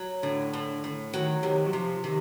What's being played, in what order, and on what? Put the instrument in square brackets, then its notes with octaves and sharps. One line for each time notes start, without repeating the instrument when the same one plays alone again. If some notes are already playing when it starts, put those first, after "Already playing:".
Already playing: [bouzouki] F#3
[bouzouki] A2 [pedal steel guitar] D3
[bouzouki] A2
A2
[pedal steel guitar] D#3 [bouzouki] F#3
[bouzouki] C3 [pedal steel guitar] D#3
[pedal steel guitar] F#3
[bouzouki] C3 [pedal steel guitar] F3
[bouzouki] C3 [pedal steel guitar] D#3